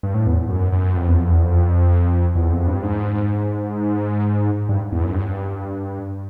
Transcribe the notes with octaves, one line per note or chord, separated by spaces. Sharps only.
G2
A2
E2
F#2
F#2
F2
E2
F2
E2
F2
E2
F2
G2
G#2
G2
E2
F#2
G2